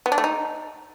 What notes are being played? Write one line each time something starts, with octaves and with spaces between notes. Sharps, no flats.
B3
D4
A3
D#4